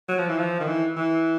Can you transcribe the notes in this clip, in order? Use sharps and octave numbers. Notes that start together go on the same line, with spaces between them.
F#3
F3
E3
F3
D#3
E3
E3